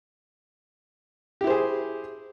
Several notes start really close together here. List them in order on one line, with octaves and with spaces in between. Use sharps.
G4 E4 C5 G#4